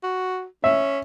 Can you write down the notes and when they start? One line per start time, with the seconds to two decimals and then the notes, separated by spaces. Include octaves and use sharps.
0.03 F#4
0.64 C#4 E5